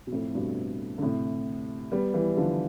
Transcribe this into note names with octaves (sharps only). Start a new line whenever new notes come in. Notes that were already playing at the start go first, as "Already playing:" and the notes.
B2
F2 A2
G2 B2
D3
A2 C3
G3 B3
E3 G3
D3 F3